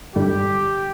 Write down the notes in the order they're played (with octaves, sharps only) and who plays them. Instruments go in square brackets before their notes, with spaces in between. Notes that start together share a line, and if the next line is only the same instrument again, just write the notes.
[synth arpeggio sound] G2 D3 G3 [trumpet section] G4